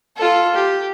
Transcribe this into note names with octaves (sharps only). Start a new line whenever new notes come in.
F4 A4
G4